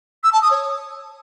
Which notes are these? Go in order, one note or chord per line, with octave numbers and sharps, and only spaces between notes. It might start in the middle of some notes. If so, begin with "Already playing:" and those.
E6
A5
D#6
C#5